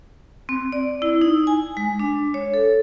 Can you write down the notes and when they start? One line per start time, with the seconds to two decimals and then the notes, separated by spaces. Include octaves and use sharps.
0.49 C4
0.72 D5
1.02 E4
1.21 D#4
1.47 G#5
1.77 G#3
1.99 D4
2.34 C#5
2.54 A4